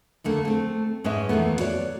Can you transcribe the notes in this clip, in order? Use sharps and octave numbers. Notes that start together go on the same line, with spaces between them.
D#2 D3 A3 A#3
A3 C4
G#2 G#3 C#4 B4 D#5 E5
D#2 A#2 E3 A3 B3
F#4 C#5 D5